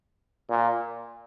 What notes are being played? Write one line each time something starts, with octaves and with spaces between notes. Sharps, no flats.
A#2